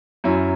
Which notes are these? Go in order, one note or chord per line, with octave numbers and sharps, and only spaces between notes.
F#2 F#3 C#4 E4